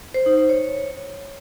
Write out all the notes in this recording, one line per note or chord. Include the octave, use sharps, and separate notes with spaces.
C5
D#4
C5
C#5